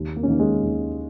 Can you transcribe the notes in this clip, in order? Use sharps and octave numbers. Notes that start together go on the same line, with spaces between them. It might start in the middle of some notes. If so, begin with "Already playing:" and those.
Already playing: D#2
A#3
C#4
D#3 A#3
G#3
D#2